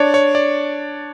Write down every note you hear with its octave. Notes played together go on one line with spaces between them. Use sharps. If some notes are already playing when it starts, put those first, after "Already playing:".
Already playing: D4 C#5 D5
C#5
D5